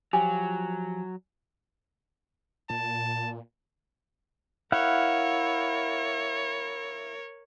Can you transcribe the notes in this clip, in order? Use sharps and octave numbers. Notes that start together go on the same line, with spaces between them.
F3 F#3 F4 G4 G#5
A#2 A5
E4 A#4 C#5 F5 F#5